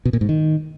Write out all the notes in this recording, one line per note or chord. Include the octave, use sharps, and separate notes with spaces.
B2
A#2
G#2
D#3